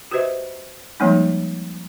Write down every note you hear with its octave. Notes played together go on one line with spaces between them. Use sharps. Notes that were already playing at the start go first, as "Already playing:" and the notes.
F#4 G4 B4 C5 D#5 E5
F3 G3 G#3 A#3 C4 D#4